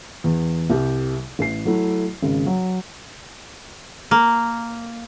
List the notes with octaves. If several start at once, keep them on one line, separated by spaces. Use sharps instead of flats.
E2
C2 G4
A1 C7
F#3 A3 E4
G#1 C#3
F#3
A#3